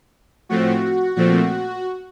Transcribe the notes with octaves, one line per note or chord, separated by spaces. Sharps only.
A2 F3 A3 C4 F#4
A#2 F3 A3 C4 F#4